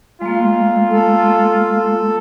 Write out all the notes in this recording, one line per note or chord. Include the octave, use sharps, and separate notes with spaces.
G#3 A#3 F4
A4